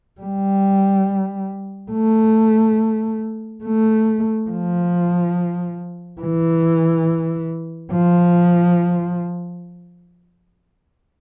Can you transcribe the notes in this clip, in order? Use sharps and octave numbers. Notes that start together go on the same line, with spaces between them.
G3
A3
A3
F3
E3
F3